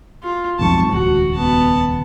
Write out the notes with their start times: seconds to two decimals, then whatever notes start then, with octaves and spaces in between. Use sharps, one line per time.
0.23 F4
0.59 B1 F2 G#2 A5 C#6
0.91 D#1 C#2 F#4
1.35 B3 A5